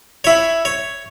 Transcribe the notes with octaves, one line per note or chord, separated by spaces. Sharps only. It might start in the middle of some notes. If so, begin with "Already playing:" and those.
E4 C#5
C#5